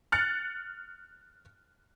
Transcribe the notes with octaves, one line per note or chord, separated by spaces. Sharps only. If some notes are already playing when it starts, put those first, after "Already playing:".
F6 F#6 A6 C#7